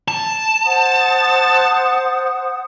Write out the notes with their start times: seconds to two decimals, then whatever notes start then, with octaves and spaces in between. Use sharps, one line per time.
0.08 A5
0.65 C5 F#5 D#6